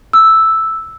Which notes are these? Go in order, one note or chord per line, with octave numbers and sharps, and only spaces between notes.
E6